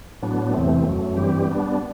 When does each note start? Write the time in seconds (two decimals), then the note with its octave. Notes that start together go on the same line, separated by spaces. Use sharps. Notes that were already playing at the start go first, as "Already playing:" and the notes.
0.22 A2 F#3 B3 D4
0.53 E2 C3 E3 A3 C4
0.85 F#2 F#3 A3
1.16 G2 E3 G3 C4 G4
1.47 G3 B3 D4